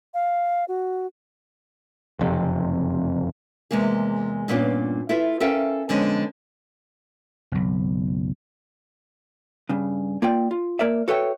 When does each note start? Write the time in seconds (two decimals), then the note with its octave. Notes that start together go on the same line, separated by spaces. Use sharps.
0.14 F5
0.68 F#4
2.19 F#1 F2 A2 C3
3.71 E2 C3 G#3 A#3 G#4
4.48 G2 A#2 B3 C#4 D4 F4
5.09 E4 F4 A4 B4 E5
5.40 C#4 A4 A#4 E5 F5 G5
5.89 F2 D3 G#3 B3 C#4
7.52 F#1 B1
9.69 G2 C#3
10.22 A#3 F4 D5 G5
10.51 F4
10.79 A#3 A#4 D5 E5
11.08 F#4 A4 B4 C#5 E5 G5